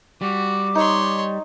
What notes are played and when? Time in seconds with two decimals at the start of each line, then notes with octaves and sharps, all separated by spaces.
0.22 G3 F#4 D6
0.75 D#4 C#5 C6